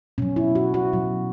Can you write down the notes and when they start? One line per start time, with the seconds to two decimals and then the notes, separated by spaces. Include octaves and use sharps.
0.18 B2 F#3 C#4
0.36 E4
0.55 F#4
0.74 F#4
0.93 B2 F#3